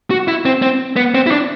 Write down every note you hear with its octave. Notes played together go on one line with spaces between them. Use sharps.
F#4
E4
C4
C4
B3
C4
E4
D4